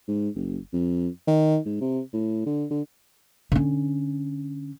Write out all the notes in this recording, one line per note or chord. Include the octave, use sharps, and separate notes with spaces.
G#2
F#1
F2
D#3
G#2
C3
A2
D3
D3
D3 C#4